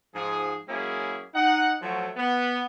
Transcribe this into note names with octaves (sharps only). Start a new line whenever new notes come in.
G#2 F3 G#4
F#3 G#3 A#3 C#4 E4 G#4
D#4 F#5
F3 F#3 A3
B3